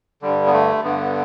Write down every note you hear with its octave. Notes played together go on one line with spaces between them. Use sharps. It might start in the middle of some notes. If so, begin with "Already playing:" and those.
G2 D3 G3
B3
A3
G2 D3 B3